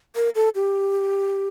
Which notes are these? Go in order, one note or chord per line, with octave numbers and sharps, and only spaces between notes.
A#4
A4
G4